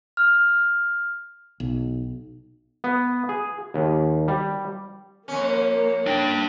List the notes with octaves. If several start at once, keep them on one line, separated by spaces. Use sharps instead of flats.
F6
B1
B3
G#4
D#2
G3
F2 A#3 C#4
D4 G5